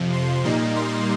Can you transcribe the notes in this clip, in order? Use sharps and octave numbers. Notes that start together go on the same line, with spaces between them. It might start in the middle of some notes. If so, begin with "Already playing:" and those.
Already playing: F2 C3 F3
C6
A#2 G3 A#3 D#4
C6